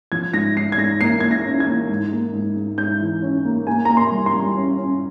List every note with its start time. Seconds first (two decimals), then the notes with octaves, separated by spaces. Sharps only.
0.12 F3 G#6
0.34 G#2 A#6
0.57 G#2 C7
0.72 G#6
0.78 G#2 A#6
1.01 A#3 C7
1.20 A#3 G#6
1.31 A#6
1.45 C#4
1.60 G#6
1.67 A#3
1.89 G#2
2.12 A#3
2.33 G#2
2.57 G#2
2.78 G#2 G6
3.00 E3
3.22 C#4
3.45 A#3
3.67 A#3 G#5
3.85 A#3 A#5
3.97 C6
4.12 G3
4.26 C6
4.33 G3
4.56 C#4
4.78 C#4